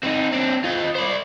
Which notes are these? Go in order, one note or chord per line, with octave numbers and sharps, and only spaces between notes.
C4 D#4
C4 D4
F4 D#5
C5 D5